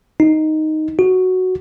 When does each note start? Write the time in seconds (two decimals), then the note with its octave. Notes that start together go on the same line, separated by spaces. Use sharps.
0.20 D#4
0.99 F#4